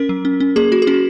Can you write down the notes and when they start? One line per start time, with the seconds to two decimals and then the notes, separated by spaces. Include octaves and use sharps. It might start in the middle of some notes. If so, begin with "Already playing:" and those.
Already playing: C#4 A#4
0.09 F#3
0.25 C#4
0.40 C#4
0.56 A#3 G#4
0.72 A#3 F#4
0.82 G#4
0.87 C#4 F#4